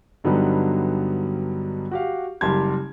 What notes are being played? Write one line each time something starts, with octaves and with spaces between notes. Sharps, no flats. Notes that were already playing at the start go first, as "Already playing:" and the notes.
G2 D3 F#3 G3 B3 D#4
F#4 G4 F5
F#1 G3 G4 A5 C6 G#6